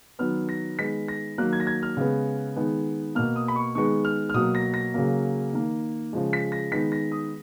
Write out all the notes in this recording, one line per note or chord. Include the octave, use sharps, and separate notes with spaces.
D#3 F#3 B3 F6
A#6
D#3 G#3 B3 B6
A#6
D#3 F#3 A#3 F#6
G#6
A#6
G#6
F6
C#3 G#3 B3
D#3 G#3 B3
B2 A#3 F6
D#6
B5
C#6
D#3 G#3 B3 C#6
F6
F6
B2 F#3 A#3 D#6
A#6
A#6
C#3 F#3 A#3
D#3 A#3
C#3 F3 G#3
B6
A#6
D#3 G#3 B3 B6
A#6
D#6